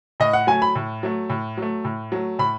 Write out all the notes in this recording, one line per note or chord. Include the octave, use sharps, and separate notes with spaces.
A2 D#5
F#5
F#3 A3 G#5
B5
A2
F#3 A3
A2
F#3 A3
A2
F#3 A3
A2 B5